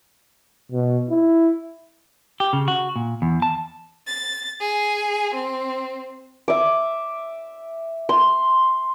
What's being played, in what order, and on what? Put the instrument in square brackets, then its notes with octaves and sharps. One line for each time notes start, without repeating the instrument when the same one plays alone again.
[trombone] B2
E4
[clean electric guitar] G4
C#3
F#4
A#2
E2
A5
[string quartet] A6
G#4
C4
[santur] E5 D6
C6